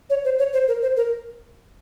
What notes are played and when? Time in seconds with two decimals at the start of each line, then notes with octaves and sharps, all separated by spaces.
0.10 C#5
0.24 C5
0.38 C#5
0.53 C5
0.68 A#4
0.82 C5
0.96 A#4